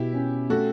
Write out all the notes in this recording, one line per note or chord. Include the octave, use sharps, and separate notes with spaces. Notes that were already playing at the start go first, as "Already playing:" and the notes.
Already playing: B2 E4 G4
C#4
A3 F#4 A4